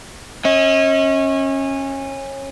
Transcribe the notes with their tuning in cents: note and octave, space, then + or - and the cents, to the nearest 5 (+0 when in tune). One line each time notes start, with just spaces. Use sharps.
C#4 -25 D#5 +40